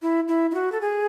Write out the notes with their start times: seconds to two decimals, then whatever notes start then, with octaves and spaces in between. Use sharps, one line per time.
0.02 E4
0.28 E4
0.51 E4
0.54 F#4
0.72 A4
0.81 G#4